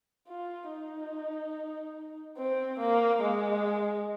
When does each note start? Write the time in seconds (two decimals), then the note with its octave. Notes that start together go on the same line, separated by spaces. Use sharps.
0.28 F4
0.70 D#4
2.38 C4
2.79 A#3
3.21 G#3